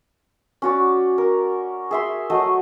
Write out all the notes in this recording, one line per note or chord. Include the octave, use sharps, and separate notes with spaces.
C#4 F#4 D5
A#4
G#4 E5 C6
F#3 A3 D#5